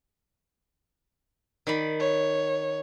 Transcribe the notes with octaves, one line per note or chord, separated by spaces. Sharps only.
D#3 D5 B5
C#5